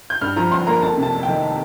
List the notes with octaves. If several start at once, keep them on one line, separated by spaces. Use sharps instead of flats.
G6
G2 F6
F3 A#5
G1 C6
A#3 A#5
F2 A5
C3
A5
F1
G5
D#3